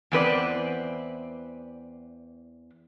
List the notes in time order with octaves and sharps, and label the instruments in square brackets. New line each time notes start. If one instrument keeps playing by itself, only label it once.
[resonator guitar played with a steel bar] E2 C4 B4 D5